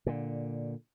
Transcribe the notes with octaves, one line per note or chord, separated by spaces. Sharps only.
A#2 D3